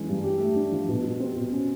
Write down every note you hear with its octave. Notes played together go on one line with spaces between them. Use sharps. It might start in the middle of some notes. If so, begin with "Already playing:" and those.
Already playing: E3 G#3 C#4
G2
G4
A3
D4
F3
B2
G3
C4
B2
C#4